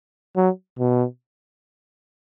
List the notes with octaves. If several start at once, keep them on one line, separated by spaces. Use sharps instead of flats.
F#3
B2